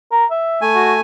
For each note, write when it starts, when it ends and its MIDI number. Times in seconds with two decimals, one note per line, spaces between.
0.12 0.25 70
0.31 0.61 76
0.61 1.01 57
0.61 1.01 80
0.75 0.94 66